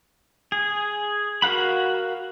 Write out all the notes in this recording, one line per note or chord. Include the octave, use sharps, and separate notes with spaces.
G#4
F#4 A#4 F5 F#5 B5